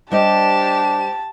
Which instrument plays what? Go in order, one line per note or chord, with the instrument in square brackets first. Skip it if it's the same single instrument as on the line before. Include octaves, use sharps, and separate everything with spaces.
[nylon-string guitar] G3 C5 D#5 [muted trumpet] D4 [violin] G4 E7 [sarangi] A5